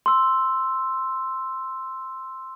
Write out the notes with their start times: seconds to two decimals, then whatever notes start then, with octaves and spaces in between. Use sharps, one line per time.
0.06 C6 E6